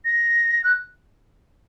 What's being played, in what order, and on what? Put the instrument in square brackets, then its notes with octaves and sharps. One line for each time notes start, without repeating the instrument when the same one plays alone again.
[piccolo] A#6
F#6